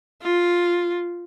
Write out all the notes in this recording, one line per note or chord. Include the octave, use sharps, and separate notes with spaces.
F4